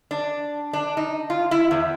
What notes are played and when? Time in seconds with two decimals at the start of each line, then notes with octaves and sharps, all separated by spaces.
0.11 D4
0.73 D4
0.97 D#4
1.30 F4
1.51 E4
1.71 E2